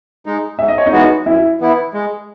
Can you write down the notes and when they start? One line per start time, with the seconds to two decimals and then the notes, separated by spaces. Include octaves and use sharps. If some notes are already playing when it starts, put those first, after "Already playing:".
0.26 G#3 D#4
0.59 G#2 E5
0.68 D#5
0.78 C#5
0.86 D#4 D#5
0.92 E3 G#3 B3 F#4
1.26 F#2 E4 E5
1.60 E3 B3 E4
1.94 G#3